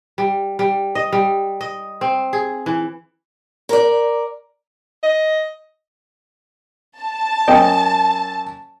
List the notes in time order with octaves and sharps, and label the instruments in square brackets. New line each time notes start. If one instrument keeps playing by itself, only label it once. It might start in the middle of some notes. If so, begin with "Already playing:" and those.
[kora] G3
G3
D#5
G3
D#5
C4
G#4
E3
[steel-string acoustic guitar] A#4 D5
[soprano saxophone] D#5
[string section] A5
[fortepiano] F#2 D#5 G5